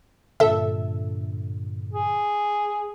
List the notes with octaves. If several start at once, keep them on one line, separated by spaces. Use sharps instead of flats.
G2 A#2 D3 A4 E5
G#4